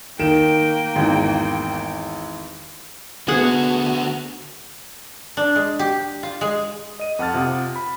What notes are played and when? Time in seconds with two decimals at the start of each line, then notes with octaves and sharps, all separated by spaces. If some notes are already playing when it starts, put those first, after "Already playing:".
0.19 D#3 A#3 G5 D7 E7
0.96 G#1 E2
3.28 D3 B3 F#4 G#4 F#5
5.37 D4
5.55 G#3
5.79 G4
6.23 F4
6.41 G#3
6.99 D#5 D#7
7.19 F2 F#5 A5 F6 A6
7.34 C3 F4 F#5 D#6
7.76 B5